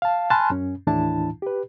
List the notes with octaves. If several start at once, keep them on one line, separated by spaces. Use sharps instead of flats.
F5 A5
G#5 A5 B5 C6 F6 F#6
F#2 C#4
D#2 A2 E3 D4 E4 A5
G4 B4